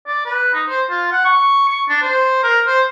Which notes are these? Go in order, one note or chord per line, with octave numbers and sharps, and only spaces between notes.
D5
B4
D#4
C5
F4
F#5
C#6
C#6
D4
C5
A#4
C5